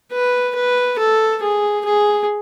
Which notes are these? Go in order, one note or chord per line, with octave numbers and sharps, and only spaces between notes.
B4
B4
A4
G#4
G#4